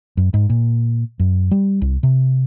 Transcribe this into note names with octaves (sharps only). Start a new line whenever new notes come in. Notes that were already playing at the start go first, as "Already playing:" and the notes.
F#2
G#2
A#2
F#2
G3
C2
C3